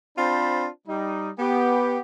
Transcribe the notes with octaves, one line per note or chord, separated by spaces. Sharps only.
C4 D4 F4 C5 A5 B5
G3 D#4
B3 G4